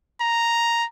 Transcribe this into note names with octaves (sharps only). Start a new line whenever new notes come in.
A#5